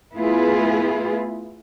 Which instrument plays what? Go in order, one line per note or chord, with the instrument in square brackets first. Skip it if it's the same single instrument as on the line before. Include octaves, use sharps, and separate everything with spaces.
[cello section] A3 B3 E4 F4 G#4 B4